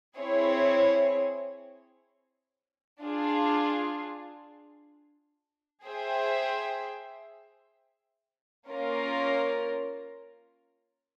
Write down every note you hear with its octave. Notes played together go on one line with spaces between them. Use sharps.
C4 E4 G#4 C#5
D4 F4 G#4
G#4 C5 E5 G5
A#3 C#4 F4 A#4